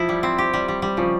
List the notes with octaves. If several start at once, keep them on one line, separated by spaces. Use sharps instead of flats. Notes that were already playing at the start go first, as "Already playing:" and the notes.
Already playing: F3 E4
G3
C4
G4
G3
G3
G3
C#3 F3